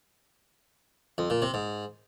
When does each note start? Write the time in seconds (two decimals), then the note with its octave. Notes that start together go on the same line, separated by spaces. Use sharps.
1.18 F2
1.30 A#2
1.42 C3
1.54 G#2